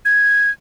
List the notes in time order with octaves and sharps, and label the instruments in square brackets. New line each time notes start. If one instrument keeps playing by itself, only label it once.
[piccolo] G#6